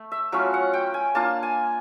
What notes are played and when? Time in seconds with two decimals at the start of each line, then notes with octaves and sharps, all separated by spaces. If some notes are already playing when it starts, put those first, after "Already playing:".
Already playing: A3
0.12 E5
0.32 F#3 A3 C#4 F4 F5
0.54 F#5
0.73 G5
0.94 G#5
1.15 A#3 D4 F4 A5
1.43 G#5